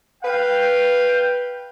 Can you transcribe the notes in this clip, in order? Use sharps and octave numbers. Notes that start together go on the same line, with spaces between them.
B4 F5 G5